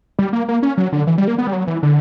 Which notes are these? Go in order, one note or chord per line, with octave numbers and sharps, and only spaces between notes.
G3
A#3
A#3
C#4
F#3
D3
E3
G3
A#3
B3
G3
F#3
E3
D3